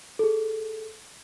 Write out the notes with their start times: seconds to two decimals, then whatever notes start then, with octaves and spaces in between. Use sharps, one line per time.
0.19 G#4 A4